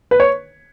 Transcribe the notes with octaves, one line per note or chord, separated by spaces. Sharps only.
B4
C#5